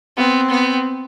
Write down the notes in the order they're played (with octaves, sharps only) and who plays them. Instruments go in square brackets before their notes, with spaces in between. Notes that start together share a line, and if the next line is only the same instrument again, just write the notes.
[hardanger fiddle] B3 [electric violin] C4
[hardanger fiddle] B3